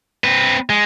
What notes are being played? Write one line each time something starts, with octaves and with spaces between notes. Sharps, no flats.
C4 B4
G#3